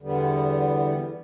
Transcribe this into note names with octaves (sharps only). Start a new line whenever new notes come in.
E2 D3 G3 B3